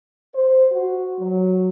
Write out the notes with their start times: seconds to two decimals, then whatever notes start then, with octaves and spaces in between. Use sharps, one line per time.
0.35 C5
0.71 F#4
1.20 F#3